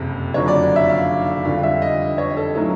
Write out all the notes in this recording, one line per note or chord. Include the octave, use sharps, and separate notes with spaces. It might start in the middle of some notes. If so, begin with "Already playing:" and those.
Already playing: F#1 F2 C3
F#1 F2 D3 F#3 C#5
D5
E5
F5
F2 D3 G3 F5
E5
D#5
C#5
A4
A2 F#3 A#3 C#4 E4 A4